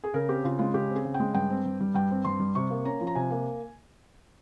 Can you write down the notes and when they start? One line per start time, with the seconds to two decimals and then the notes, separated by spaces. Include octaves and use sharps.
0.04 G#4
0.14 C#3 A#4
0.28 C4 G4
0.44 C#3 F4
0.59 G#3 F4
0.74 C#3 G4
0.90 C4 G#4
1.05 C#3
1.14 G5
1.20 G#3
1.34 G2 G5
1.50 C4
1.65 G2
1.80 G3
1.94 G2 G5
2.11 C4
2.24 G2 C6
2.40 G3
2.55 C3 C#6
2.70 A#3
2.85 C#4 A#5
3.01 F3
3.07 A#5
3.15 C3 G#5
3.30 A#3